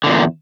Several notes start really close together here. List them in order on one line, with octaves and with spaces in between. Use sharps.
D3 A#2 E2